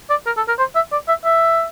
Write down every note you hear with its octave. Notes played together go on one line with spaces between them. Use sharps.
D5
A#4
A4
A#4
C5
E5
D5
E5
E5